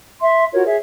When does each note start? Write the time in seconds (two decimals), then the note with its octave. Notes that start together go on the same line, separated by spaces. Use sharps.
0.20 E5 C6
0.53 F4 F#4 A#4 C#5
0.65 G#4 C#5 E5